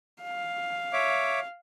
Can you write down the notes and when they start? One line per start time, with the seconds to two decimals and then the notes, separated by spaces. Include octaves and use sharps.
0.23 F5
0.93 C#5 E5 D6